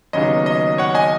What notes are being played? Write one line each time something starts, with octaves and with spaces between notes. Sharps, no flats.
D#2 C#3 F#3 B3 D#4 D#5
D#5
C#5 F#5
D#5 G#5